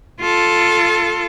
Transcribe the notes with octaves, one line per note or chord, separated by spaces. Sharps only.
F4 A4